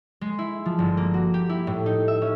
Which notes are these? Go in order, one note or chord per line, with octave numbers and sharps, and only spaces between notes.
G#3
E4
F3
G1
A#3
F#4
G4
E4
A2
D#4
E5
C#4